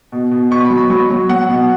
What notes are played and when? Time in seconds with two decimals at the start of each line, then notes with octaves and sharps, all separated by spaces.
0.12 B2
0.31 B2
0.51 B2 C#6
0.65 B5
0.70 F#3
0.77 B5
0.90 F#3 C#6
1.10 F#3
1.29 F#3 F#5
1.49 B2